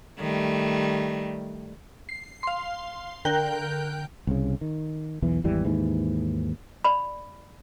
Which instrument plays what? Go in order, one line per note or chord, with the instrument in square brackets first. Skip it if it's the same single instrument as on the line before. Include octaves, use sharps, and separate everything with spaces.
[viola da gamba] D#3 G3 A3
[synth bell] C7
F5 C6
D3 A#4 G5 F#6 G6
[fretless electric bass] C2 C#3
D#3
B1 E2 E3
G#1 E2 E3 G3
D#2 G#2 E3
[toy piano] D5 B5